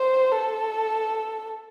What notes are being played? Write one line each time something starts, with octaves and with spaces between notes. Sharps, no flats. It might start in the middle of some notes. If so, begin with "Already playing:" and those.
Already playing: C5
A4